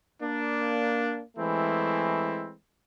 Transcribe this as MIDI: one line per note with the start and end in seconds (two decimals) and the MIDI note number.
0.21 1.21 58
0.21 1.21 62
1.37 2.53 52
1.37 2.53 56
1.37 2.53 57
1.37 2.53 60
1.37 2.53 64